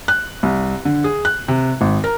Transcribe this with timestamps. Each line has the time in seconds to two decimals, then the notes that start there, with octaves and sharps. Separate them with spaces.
0.08 F#6
0.43 C2
0.85 D3
1.04 G#4
1.25 F#6
1.48 C3
1.81 G#1
2.04 A#4